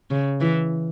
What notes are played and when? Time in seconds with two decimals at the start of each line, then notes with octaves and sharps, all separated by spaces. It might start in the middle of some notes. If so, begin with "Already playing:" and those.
0.11 C#3
0.40 E3